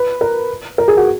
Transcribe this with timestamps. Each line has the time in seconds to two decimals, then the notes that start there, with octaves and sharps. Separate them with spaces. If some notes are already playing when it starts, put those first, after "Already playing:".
Already playing: B4
0.21 A#4
0.78 A#4
0.88 G#4
0.97 F#4